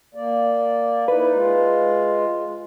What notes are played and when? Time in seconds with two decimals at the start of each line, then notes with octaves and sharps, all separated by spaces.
0.15 A#3 D5
1.08 D#4 E4 B4
1.33 G#3 F4